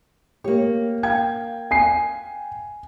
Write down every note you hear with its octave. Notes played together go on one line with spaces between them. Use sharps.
A#3 G4 C#5
F5 G5 G#6
G#5 C7